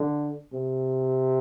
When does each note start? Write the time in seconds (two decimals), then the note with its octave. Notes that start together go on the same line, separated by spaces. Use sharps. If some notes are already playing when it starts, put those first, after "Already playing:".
Already playing: D3
0.53 C3